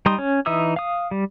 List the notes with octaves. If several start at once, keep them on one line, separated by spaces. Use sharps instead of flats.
G3 D#4 C6 D#6
C#4
E3 D#4 E5 D#6 E6
F5 D#6
G3